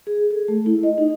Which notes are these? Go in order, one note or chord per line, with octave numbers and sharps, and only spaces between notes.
G#4
A4
A3
E4
D#5
D#4